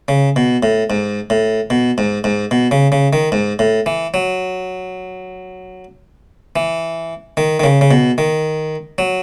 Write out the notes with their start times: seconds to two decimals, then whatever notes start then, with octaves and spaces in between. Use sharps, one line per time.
0.08 C#3
0.36 B2
0.63 A2
0.90 G#2
1.30 A2
1.70 B2
1.98 G#2
2.24 G#2
2.51 B2
2.71 C#3
2.92 C#3
3.13 D#3
3.32 G#2
3.59 A2
3.86 E3
4.14 F#3
6.56 E3
7.37 D#3
7.60 D#3
7.63 C#3
7.81 C#3
7.91 B2
8.18 D#3
8.98 F#3